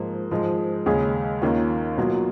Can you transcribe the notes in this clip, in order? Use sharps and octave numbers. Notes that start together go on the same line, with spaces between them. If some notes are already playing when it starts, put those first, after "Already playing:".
Already playing: G#2 F3 A#3
G#2 F3 G#3
D#2 C#3 G#3 C#4 G#4
D#2 D#3 A#3 C#4 F4
B2 F#3 A#3 F4